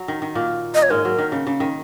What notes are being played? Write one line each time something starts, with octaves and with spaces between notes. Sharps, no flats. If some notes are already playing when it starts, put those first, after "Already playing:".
Already playing: F#3
D#3
D#3
A#2 A#3
D#5
C#5
G#2 G#3 A#4
F#3
D#3
C#3
C#3
D#3